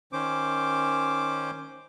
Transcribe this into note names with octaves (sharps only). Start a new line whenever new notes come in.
D#3 C#4 C5 D6